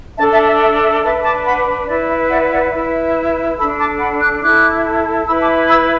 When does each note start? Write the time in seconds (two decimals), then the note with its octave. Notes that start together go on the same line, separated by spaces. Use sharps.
0.18 D4 E5 A5
0.22 A4
0.32 E5 A5
0.47 E5
0.61 E5
0.82 E5
1.03 D4 B4 E5 A5
1.24 A5 D6
1.46 F#5 B5
1.88 E4 B4 D5
2.09 E5
2.30 D5 F#5
2.51 D5 F#5
2.73 E4 B4 E5
3.57 A4 B5 E6
3.62 D4
3.79 A5 D6
4.00 F#5 B5
4.21 D6 F#6
4.42 E4 A4 D6 F#6
5.27 E4 B4 B5 E6
5.41 A5 D6
5.69 B5 E6